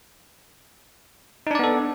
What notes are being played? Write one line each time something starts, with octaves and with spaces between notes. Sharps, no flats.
B3 D4 D#4 A4 D5